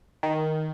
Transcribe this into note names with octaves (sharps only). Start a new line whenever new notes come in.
D#3